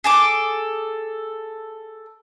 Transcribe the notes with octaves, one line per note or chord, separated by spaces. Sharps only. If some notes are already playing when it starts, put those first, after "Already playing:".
G#4 A4 D6